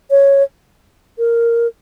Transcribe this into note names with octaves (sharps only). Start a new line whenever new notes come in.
C#5
A#4